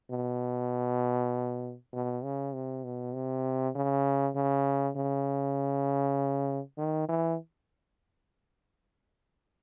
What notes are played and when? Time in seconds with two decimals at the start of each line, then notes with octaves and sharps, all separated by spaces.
0.11 B2
1.93 B2
2.24 C#3
2.54 C3
2.84 B2
3.15 C3
3.75 C#3
4.36 C#3
4.96 C#3
6.78 D#3
7.08 E3